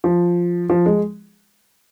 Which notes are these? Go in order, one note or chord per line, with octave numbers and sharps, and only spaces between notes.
F3
F3
G#3